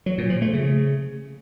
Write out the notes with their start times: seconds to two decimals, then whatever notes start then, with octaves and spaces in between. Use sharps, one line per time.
0.06 F#3
0.18 A#2
0.30 F3
0.42 A3
0.53 C#3